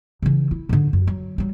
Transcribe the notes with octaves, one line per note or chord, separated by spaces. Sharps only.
C#3 E3
E4
G#2 D3
F#2
F#3
F#3 G3